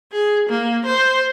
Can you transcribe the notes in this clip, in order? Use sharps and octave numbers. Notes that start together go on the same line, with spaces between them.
G#4
A#3
C5